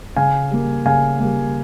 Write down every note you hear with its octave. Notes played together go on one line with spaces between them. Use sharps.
C#3 F5 G#5
G3 A#3
C#3 F5 G#5
G3 A#3